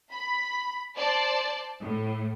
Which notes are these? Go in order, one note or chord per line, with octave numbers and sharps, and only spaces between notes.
B5
C5 D5 A5
A2